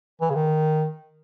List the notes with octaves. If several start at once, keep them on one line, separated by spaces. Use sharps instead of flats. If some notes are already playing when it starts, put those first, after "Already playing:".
E3
C#3
D#3